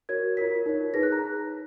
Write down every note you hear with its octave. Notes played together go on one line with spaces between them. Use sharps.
F#4 A#4 C#5 G#6
F4 A#4 C#5 B6
D#4 A#4 C#5
D#4 G#4 B4 A#6
F#6
A#5